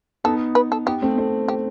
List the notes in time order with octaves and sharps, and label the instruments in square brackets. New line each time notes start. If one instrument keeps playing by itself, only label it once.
[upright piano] B3 D#4 [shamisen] A4
[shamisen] B4
A4
[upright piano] B3 D#4 [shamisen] G4
[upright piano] A3 C4
A3 C4
[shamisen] G4